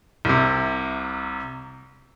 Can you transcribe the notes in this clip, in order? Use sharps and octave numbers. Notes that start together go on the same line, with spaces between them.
C2 C3